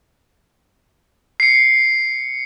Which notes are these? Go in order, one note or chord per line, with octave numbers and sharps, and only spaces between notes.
C7 C#7